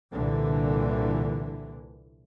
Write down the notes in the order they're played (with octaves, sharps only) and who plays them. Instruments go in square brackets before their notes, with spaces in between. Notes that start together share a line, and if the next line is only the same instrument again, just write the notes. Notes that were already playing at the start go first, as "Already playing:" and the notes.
[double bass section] C2 A#2 D3 E3